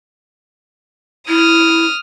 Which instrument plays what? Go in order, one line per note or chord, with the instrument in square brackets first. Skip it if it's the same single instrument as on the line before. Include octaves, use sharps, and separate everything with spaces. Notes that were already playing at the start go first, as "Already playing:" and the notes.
[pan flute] E4 [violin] D#6 F6